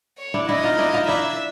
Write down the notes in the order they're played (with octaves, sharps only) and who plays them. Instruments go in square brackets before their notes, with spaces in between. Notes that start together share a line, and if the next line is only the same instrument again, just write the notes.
[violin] C#5
[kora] D4 E4
[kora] D4 E4 [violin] D#5
[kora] D#4 F4
D4 E4
D#4 F4
[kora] D4 E4 [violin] E5